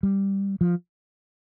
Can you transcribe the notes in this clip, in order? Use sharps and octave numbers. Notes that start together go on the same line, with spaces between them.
G3
F3